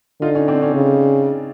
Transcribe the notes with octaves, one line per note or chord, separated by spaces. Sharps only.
D3 D#4 F4
C#4 D#4
C4 D4
C#4 D#4
C#3